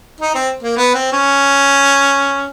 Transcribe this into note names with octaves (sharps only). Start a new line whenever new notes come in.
D#4
C4
A#3
B3
C4
C#4